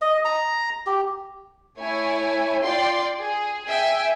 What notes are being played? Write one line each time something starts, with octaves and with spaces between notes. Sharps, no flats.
D#5
A#5
G4
A3 E4 C#5 G#5
F4 D5 G5 C6
G#4
E5 G5 G#5